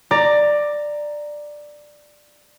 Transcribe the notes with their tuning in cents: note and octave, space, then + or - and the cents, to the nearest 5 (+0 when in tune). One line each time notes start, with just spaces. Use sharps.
D5 +10 A#5 -5